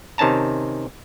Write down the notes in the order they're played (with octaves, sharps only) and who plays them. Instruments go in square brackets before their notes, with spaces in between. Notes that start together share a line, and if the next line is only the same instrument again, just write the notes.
[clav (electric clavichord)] C3 D#3 C#4 A5 A#5